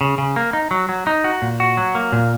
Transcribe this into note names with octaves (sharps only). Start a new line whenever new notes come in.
C#3
C#3
A#3
D#4
F#3
F#3
D#4
F#4
A#2
F#4
F#3
A#3
A#2